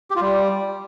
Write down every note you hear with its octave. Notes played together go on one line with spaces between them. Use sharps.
G4
F4
G3